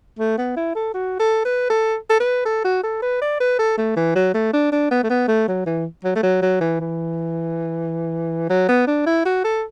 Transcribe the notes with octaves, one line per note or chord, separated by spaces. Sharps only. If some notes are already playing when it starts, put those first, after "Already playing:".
A3
B3
E4
A4
F#4
A4
B4
A4
A4
B4
A4
F#4
A4
B4
D5
B4
A4
A3
E3
F#3
A3
D4
D4
B3
A3
B3
A3
F#3
E3
F#3
A3
F#3
F#3
E3
E3
F#3
B3
D4
E4
F#4
A4